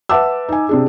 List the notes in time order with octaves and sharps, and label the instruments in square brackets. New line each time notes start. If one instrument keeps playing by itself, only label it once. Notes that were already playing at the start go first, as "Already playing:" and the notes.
[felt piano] B4 E5 F#5 A5 D6 E6
D#4 G#5
C3 D4 G#4